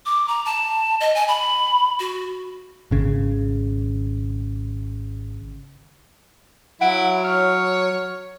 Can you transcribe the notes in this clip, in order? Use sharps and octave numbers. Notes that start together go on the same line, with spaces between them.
D6
A#5
A5
D#5
G#5
B5
F#4
G#1 C#3
F#3 E4 F#5 D7
C#5 F6